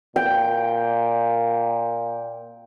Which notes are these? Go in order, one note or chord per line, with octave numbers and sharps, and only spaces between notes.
A#2 G5